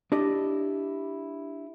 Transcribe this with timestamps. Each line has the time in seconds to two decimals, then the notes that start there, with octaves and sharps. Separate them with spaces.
0.12 D4 E4 G4 D5 D#5